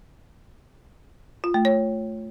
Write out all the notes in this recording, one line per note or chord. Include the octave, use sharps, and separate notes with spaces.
F4
A3
C#5